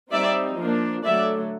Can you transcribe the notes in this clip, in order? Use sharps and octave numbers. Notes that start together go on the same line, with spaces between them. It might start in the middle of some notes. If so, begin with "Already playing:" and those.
G3 C4 D#4 D5 E5
F3 A#3 D4
D3 F#3 A3 D5 E5